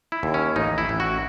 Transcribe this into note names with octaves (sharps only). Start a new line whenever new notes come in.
E4
D#2
C#4
A1 D#4
E4
A1
F#4